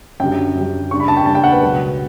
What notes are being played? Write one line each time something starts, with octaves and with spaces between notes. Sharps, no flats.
F#2 D3 G3 G5
F#2 D3 G3
C#3 G3 D4 C#6
B5
A5
G5
C#3 G3 D4 A5
G5
F#5
B4
C#2 B2 F#3